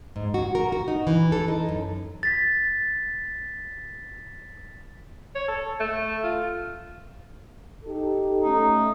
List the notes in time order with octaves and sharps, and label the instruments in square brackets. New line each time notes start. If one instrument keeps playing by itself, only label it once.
[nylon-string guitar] G#2
F#4
A#4
F#4
D#4
E3
A4
D#4
F#2
[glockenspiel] A6 B6
[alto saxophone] C#5
A4
A3
F4
[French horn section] D#4 G4 A4
[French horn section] A3 C#4 [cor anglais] D#4